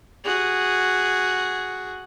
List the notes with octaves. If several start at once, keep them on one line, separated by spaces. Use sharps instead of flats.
F#4 G#4